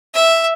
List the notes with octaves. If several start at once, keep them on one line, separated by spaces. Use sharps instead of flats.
E5